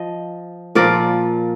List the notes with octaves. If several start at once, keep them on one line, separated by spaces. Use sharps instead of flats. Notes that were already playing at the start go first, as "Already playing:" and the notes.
Already playing: F3 D#5
A#2 F3 A#4 D5